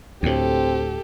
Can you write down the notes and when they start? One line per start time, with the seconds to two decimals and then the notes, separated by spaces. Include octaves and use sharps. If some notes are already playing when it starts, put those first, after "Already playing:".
0.23 D2 A2 C4 G4 A4